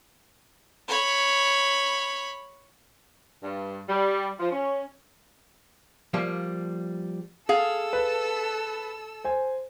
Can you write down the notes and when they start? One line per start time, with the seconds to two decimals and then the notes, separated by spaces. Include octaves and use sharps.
0.88 C#5 B5
3.43 G2
3.88 G3
4.39 F3
4.52 C#4
6.14 F3 G3 A#3
7.49 G#4 A4 F5 E6
7.93 B4
9.24 C5 G#5